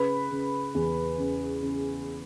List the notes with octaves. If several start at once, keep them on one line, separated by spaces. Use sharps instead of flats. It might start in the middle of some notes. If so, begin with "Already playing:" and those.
Already playing: C#3 B4 B5
C#3
E2
C#3
C#3